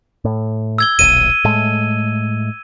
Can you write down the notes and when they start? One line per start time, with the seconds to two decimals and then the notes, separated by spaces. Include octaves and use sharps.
0.25 A2
0.78 E6 G#6 G7
0.99 D#1 B1 D#7
1.44 A2 G#3 A3